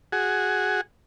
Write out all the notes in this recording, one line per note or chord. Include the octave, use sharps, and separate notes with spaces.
F#4 G#4